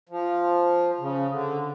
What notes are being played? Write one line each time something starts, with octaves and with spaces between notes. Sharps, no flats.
F3
C#3
D3